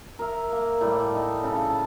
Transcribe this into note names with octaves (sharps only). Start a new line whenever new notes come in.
A#4 E5
A#3
A2 G3
D#4
C#3 A4
A5